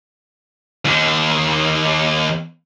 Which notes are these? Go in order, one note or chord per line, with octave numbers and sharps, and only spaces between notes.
D#2 D#3